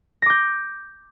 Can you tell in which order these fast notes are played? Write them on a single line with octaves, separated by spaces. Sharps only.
A#6 D6 G6